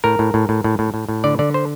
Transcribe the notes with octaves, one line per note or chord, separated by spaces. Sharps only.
A2 A#4
A2
A2
A2
A2
A2
A2
A2
D3 D5
D3 D5
C5